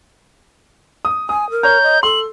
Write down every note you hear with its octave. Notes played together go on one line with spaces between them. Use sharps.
D#6
G#5 D#6
A#4
C#5 A#5 G6
D#5
A4 C6 F#7